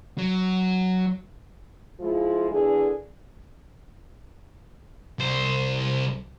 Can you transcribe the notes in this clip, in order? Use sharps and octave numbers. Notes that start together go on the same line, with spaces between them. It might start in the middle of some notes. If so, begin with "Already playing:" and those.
F#3
F3 G#3 E4 F4
E2 D3 G#4
C2 C5